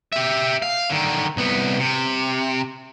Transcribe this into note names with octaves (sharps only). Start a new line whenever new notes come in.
G4 E5
F5
D3 D#3
C2 B3
C3